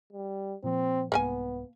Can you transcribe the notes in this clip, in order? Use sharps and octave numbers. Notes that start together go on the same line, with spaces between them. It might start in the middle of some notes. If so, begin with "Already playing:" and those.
G3
A#2 F3 C4
C2 G#2 A#3 B3 A#4 G#5